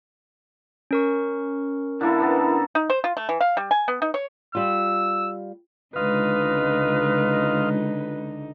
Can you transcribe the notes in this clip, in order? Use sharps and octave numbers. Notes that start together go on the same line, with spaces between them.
C#4 A#4 C#6
D3 A#3 E4 A4
A#3 B3 A4
D#4
C5
F4
A3
E3
F5
G3
G#5
B3
D#4
C#5
G3 F4 E6
C#2 D3 D#4 F4 B4 D#5 F5